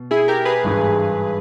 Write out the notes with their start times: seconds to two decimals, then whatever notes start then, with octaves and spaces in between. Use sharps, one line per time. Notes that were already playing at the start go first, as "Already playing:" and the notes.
Already playing: B2
0.11 E4 G#4
0.28 G4 A#4
0.45 G#4 B4
0.63 G#1 G2 E3